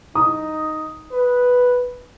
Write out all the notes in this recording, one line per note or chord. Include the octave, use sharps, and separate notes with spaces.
D#4 D#6
B4